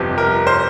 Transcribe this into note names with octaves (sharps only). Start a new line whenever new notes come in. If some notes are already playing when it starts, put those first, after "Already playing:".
Already playing: G1 F2 C3
A#4
C5